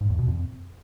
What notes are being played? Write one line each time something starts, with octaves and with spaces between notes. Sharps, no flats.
G#2
E2
B2
F2